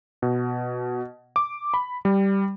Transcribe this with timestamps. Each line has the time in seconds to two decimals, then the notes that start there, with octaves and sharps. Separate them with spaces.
0.22 B2
1.36 D6
1.74 B5
2.05 G3